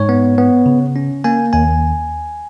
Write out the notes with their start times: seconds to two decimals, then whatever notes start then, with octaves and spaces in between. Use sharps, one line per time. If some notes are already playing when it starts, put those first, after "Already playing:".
Already playing: G#2 C#5
0.09 B3
0.38 B3
0.66 C#3
0.96 C#4
1.24 A#3 G#5
1.53 D#2 G#5